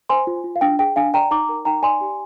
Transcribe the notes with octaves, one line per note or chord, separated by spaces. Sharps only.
C5 G#5 C6
F4
F4
F5
D4 G5
G#4 G5
D4 F5 G#5
D5 G5 A#5
D#4 A#5 D6
A#4
D#4 G5 A#5
D5 G#5 C6
G4